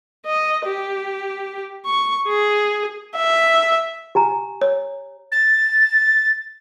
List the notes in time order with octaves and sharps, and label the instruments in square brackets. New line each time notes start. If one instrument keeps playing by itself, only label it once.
[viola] D#5
G4
C#6
G#4
[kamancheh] E5
[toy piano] G4 G#5 A#5
[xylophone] C#5
[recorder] A6